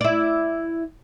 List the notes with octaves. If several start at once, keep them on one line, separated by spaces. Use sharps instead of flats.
E4 D5